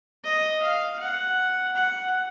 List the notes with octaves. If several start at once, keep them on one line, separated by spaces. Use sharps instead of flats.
D#5
F5
F#5
F#5